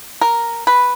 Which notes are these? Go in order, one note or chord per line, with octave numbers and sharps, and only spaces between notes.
A#4
B4